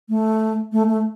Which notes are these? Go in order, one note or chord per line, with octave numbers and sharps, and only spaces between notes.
A3
A3
A3